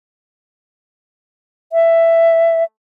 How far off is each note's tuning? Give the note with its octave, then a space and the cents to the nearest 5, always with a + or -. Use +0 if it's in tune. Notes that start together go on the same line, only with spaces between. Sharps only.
E5 +10